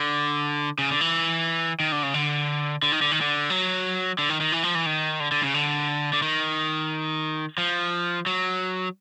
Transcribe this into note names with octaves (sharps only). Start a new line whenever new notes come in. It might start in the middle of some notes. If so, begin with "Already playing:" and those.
Already playing: D3
C#3
D3
E3
D#3
D3
C#3
D3
D3
D#3
D3
D#3
D3
F#3
D3
D#3
D#3
E3
F3
E3
D#3
D3
D3
C#3
D3
D3
D#3
F3
F#3